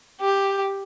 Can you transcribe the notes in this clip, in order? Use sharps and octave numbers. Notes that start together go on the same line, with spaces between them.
G4